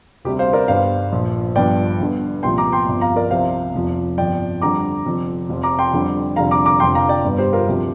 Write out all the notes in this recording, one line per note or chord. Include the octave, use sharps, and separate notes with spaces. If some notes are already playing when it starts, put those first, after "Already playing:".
D2 C3 G3 G4
C5 F5
A#4 D5
G1 G2 G3 C5 F5
A#1 A#2 F3
G1 G2 F3 D5 G5
G1 G2 D3
C2 A#2 F3 G5 C6
A#5 D6
G5 C6
G1 F2 F3
F5 A#5
A#4 D5
C2 C3 F3 C5 F5
F1 F2 F3
G1 F2 F3 D5 G5
F2 D3 G3 A#5 D6
F1 F2 F3
F1 F2 F3
A#5 D6
G5 C6
F2 D3 G3
F1 F2 D3 G3 F5 A#5
A#5 D6
A#5 D6
F1 F2 D3 F3 G5 C6
F5 A#5
D5 G5
G1 G2 G3
G4 C5
F4 A#4
D2 C3 F3 G4